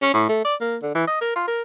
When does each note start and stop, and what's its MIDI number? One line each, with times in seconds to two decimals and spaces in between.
0.02 0.09 61
0.14 0.27 45
0.29 0.41 57
0.45 0.55 74
0.61 0.77 58
0.83 0.92 50
0.95 1.06 52
1.07 1.18 75
1.21 1.35 70
1.36 1.46 65
1.48 1.62 70